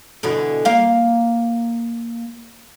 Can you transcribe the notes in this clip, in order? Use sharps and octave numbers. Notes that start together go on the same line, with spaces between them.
B2 D3 E3
A#3 F5